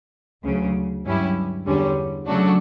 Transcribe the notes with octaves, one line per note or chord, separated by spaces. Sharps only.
D2 C#3 F#3
G2 F#3 C#4 E4 G4
E2 D3 G3 C#4
C#3 F#3 A3 D4 F#4